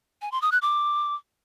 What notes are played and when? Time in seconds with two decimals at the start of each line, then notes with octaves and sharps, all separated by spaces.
0.22 G#5
0.32 C6
0.42 D#6
0.52 F#6
0.62 D6